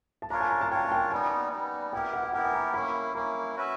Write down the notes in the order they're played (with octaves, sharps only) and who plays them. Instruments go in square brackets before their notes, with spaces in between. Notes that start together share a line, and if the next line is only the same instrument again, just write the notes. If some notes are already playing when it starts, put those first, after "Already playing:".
[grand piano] A5
[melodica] D4 F4 A#4 C#5 [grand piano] A#5
[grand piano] G#5
A#5
A5
[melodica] D4 F4 A#4 C#5 [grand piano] G5
[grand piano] G#5
G5
[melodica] G3 B3 D#4 [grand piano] G#5
[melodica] G3 B3 D#4
[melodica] B3 E4 G4 A#4 [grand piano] G5
[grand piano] F#5
F#5
[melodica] B3 E4 G4 A#4 [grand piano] G5
[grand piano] G#5
A#5
[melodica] A#3 C#4 E4 [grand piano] B5
[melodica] A#3 C#4 E4 [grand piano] A#5
[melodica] C#4 F#4 B4 E5